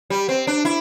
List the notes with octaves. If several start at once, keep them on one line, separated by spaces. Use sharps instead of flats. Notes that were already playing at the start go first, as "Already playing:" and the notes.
G3
C4
D4
E4